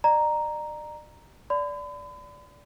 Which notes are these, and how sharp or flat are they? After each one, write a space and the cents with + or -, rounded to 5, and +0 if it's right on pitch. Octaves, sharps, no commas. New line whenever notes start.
D5 +40 A#5 +0
D5 -15 B5 +40